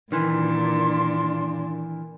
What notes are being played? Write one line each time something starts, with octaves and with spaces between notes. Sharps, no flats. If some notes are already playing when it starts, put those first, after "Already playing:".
A#2 D#3 E3 D4 C6